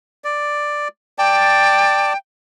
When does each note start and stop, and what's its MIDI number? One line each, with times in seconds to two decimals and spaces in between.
0.24 0.88 74
1.18 2.13 74
1.18 2.17 79
1.18 2.13 81